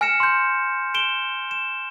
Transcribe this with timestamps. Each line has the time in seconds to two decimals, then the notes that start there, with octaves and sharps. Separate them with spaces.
0.01 G#5 F6 A#6 C#7 E7
0.20 C6 G6
0.94 D7 E7 G7
1.51 E7